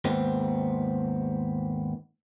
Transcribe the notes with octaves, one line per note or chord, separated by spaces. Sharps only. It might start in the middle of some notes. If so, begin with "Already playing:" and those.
D#2 G#2 B3 C4